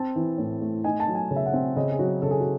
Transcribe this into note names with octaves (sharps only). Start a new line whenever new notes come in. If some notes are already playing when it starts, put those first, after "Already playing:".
Already playing: C4 A5
E3
A2
A3
D#4 G#5
A5
F#3
G#5
C#3
E5
F#5
C4
C#3 D#5
G#4
F#3 F#4
C#3 A4
G#4
F#4